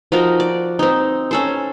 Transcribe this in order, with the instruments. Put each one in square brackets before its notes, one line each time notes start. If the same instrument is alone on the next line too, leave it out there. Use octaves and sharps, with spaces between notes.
[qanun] F3 D#4 F#4 A#4
D5
C4 D#4
C#4 A4 C5